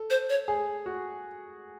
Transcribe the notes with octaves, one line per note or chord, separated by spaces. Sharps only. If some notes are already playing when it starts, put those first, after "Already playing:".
Already playing: A4
C5
C#5
G#4
F#4